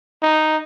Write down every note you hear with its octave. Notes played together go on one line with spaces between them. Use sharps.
D#4